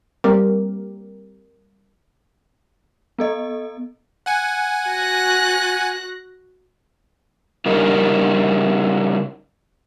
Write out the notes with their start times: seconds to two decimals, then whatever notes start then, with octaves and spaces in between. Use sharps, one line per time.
0.24 G3 A#3 C4 G4 A#4
3.19 B3 A4 D#5
4.26 F#5 G#5
4.88 F#4 F#6 A#6
7.66 C#3 G3 D#4 A#4